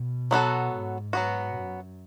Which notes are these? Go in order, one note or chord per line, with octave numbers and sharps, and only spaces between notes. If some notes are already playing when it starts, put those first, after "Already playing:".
Already playing: B2
F#3 B3 F#4 A4
G#2
F#3 B3 F#4
F#2